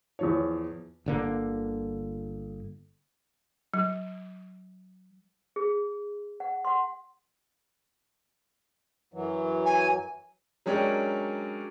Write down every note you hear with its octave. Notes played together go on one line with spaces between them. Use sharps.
E2 F3 C#5
G1 D3 A#3
F#3
G#4
F#5
F#5 C6
F#2 E3 F#3
G#5
F#3 G#3 C#4 D4 G4 A#4